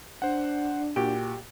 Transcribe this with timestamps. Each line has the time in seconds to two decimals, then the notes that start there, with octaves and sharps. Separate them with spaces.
0.22 D4 C5 F#5
0.96 A#2 F#4 G4